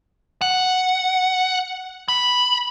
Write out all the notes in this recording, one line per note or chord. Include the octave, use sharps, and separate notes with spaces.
F#5
B5